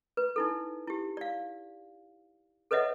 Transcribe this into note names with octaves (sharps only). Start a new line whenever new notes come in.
B4
D#4 E4 A4
E4 G4
D5 F5
A4 B4 C#5 D#5 E5 F#5